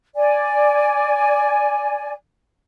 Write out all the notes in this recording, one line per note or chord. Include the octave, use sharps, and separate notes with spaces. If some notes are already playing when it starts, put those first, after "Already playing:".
D5 G#5